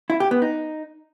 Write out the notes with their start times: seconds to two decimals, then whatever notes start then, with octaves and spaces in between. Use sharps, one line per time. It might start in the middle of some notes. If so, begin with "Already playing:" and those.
0.10 E4
0.20 G4
0.31 B3
0.42 D#4